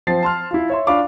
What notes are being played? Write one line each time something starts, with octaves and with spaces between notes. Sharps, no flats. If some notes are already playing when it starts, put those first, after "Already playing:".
F3 C4 A6 C7
A5 C6 F6
E4 F4
C#5 E5 C6
D4 F4 F5 B5 C#6 D6